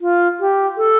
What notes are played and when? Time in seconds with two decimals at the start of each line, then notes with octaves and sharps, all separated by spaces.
0.01 F4
0.40 G4
0.77 A4